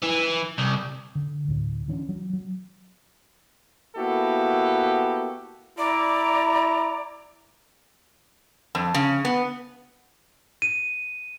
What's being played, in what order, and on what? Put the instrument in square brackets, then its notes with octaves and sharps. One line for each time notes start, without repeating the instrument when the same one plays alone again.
[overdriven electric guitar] E3
C2
[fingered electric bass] D3
D2 A2
E3 C#4 D4
F#3
F#3
[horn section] A#3 B3 E4 F#4 G4 A4
[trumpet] E4 [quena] D5 [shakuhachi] A#5
[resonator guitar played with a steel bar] F2
C#3
B3
[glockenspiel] D#7